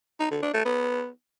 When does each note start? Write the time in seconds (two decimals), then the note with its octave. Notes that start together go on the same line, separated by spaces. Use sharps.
0.20 D#4
0.31 D3
0.42 D4
0.54 A3
0.65 B3